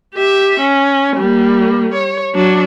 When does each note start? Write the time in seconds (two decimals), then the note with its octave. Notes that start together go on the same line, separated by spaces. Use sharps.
0.15 G4 E5
0.60 C#4
1.16 G3 A#3
1.94 C#5
2.35 F#3 D4